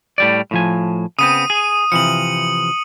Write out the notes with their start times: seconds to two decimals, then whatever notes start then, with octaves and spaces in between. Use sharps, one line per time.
0.18 A2 G3 D5
0.51 A2 F3 G#5
1.19 C#3 B3 C4 D#6 D#7
1.50 G#4
1.92 C3 E3 F3 C#7 F#7